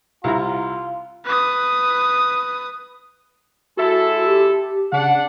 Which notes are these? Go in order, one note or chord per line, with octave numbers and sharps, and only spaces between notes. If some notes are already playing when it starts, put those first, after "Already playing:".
C2 E4 F4 A#5
B4 D#6
G#3 E4 F#4 A4
G4
C#3 D4 D5 F#5